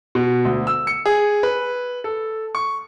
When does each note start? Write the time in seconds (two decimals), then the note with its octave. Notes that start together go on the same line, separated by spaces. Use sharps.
0.15 B2
0.45 D2
0.67 E6
0.87 C#7
1.06 G#4
1.43 B4
2.04 A4
2.55 C#6